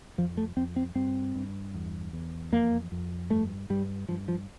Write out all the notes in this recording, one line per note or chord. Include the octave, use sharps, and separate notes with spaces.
F2 F3
A3
F2 C4
C4
G2 C4
G2
E2
E2
F2 A#3
F2
G2 A3
G2 G3
G2 F3
F3